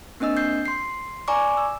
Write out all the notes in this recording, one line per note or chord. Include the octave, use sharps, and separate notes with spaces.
A#3 C4 D4 D#5 E6
G6 C7
C6 C7
D5 G#5 A#5 C#6 D6
E6